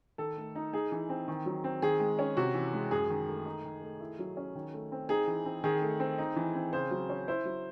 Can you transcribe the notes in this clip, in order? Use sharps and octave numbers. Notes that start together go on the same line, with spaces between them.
D#3 A4
A3
D#4
D#4 G#4
E3
C4
D#3
F#3
C4
D#3 G#4
G#3
C#4
C3 F#4
E3
G#3
F#2 G#4
D#3
A3
D#4
D#3
A3
E4
F#3
C#4
D#3
A3
C4
D#4 G#4
E3
C4
D#3 G#4
A3
C4
D#4
E3
C4
C#3 C5
F#3
C#4
E4 C5
F#3